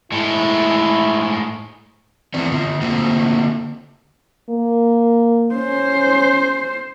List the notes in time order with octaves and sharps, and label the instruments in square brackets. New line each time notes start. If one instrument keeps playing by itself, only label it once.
[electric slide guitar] A2 G#3 [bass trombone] E4
[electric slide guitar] E3 A3 B3 C4 D5
D3 F4
D3 A3 A#3 C4 F4 F#4
[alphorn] A#3
[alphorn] C#4 [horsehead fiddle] C5